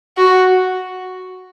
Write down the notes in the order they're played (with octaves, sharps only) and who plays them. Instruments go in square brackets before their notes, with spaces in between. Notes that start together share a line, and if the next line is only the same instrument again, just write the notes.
[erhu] F#4